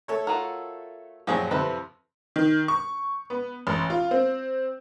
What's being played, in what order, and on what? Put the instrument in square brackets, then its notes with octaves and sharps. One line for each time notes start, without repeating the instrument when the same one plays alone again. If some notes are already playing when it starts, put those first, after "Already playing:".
[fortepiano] A3 A4 C#5
[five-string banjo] F4 F#4 A#4
[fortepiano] F#2 A#2 F3 [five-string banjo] G4 G#4 C#5
[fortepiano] F2 C3 [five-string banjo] E4 A4 B4
[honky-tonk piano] D#3
C#6
B3
A1
F4
C4